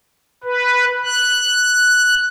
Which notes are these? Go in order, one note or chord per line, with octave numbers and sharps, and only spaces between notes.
B4
F#6